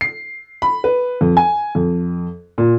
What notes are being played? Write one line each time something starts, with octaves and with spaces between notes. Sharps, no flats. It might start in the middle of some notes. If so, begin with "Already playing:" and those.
C7
B5
B4
F2
G#5
F2
A#2